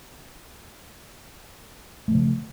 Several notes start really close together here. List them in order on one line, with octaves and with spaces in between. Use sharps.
A3 F3 C#3